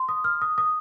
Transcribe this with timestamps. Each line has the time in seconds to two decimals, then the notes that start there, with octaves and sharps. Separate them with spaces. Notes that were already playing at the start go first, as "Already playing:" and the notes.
Already playing: C6
0.09 D#6
0.24 F6
0.42 D#6
0.58 D#6